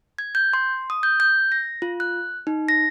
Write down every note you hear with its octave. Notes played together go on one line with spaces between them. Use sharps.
G#6
G6
C6
D#6
G6
G6
A#6
F4
F#6
D#4
A#6